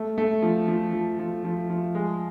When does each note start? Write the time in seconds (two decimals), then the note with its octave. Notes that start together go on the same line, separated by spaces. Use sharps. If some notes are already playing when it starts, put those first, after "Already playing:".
Already playing: A3
0.18 A3
0.42 F3
0.68 F3
0.93 F3
1.19 F3
1.44 F3
1.70 F3
1.95 G#3